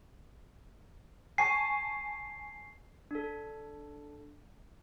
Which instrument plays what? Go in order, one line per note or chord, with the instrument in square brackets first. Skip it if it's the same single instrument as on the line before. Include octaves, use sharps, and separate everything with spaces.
[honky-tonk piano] G#5 A5 C#6 [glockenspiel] C7
[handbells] D4 A4